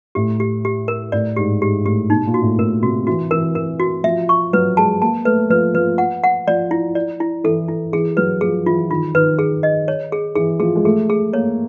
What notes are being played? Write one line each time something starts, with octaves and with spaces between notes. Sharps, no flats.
A2 G4
G4
G4
A#4
A2 D5
G#2 G4
G#2 G4
A2 G4
B2 D#4
A#2
F#4
A2
A2 A#4
C3 F#4
E3 F#4
E3 A#4
E3 A#4
F#4
F3 E5
C#6
F#3 B4
G#3 A5
A#3 A5
A3 B4
F3 B4
F3 B4
F#5
F#5
F3 D5
E4
D5
E4
E3 A4
E4
E3 G#4
F#3 B4
F3 G#4
E3 F4
D#3 F4
D#3 B4
G#4
D#5
C#5
G#4
E3 G#4
F3 G#4
G#3
A3 G#4
G#4
A#3 C#5